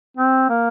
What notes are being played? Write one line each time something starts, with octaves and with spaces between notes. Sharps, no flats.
C4
A#3